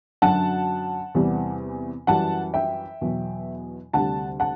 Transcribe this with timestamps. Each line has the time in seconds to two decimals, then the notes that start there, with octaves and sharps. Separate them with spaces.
0.22 F#2 D3 F#3 F#5 A5
1.15 E2 C3 E3 G3
2.07 F#2 E3 G3 F#5 A5
2.54 E5 G5
3.01 E2 B2 F#3
3.93 D2 C3 G3 F#5 A5
4.40 F#5 A5